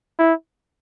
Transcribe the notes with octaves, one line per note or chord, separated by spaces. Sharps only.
E4